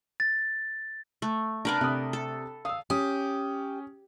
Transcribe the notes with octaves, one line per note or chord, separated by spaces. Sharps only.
A6
A3
C3 B3 D4 A#4 B4 D5
C3 A3 D#6
A4
F5 D#6 E6
C#4 G4 D#6